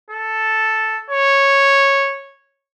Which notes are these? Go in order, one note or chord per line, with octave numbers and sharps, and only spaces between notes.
A4
C#5